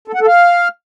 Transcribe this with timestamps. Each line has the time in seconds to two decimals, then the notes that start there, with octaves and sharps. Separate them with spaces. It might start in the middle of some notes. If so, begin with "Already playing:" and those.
0.08 A4
0.14 F#5
0.21 A4
0.27 F5